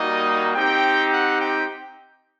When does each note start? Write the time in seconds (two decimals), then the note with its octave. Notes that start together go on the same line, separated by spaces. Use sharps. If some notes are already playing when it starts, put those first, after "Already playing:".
Already playing: G3 A#3 D#4 F#4 D#5
0.55 C4 D#4 G4 G5
1.12 F#5
1.40 G5